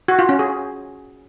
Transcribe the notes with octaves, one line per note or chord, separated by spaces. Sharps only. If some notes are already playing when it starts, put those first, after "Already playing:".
F#4
F4
C#4
G#4